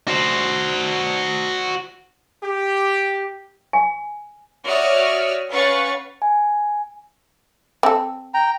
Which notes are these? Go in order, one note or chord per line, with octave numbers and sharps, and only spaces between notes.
F#4 C5
G4
G#5
F#4 C#5 D5 E5 D#6 F6
C#4 B4 F5 F#5 C#6 A6
G#5
C4 A4
G5 A#5